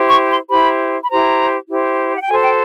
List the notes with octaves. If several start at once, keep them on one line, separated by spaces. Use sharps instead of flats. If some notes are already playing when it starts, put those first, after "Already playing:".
Already playing: E4 G4 C5
C#6
C6
E4 G4 C5 B5
B5
E4 G4 C5 A#5
E4 G4 C5
F#5
G5
F#4 A4 C5 G#5
G5